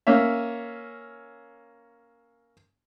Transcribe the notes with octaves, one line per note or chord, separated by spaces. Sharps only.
A#3 C#4 C#5 E5